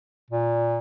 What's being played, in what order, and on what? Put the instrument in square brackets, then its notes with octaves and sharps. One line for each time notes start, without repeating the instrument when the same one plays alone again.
[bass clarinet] A#2